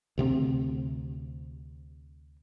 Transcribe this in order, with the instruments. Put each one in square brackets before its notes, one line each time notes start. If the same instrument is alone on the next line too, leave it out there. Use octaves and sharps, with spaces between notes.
[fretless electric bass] D2 C3 B3 C4